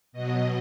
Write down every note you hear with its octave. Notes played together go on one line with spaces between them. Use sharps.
B2 F#3 D#5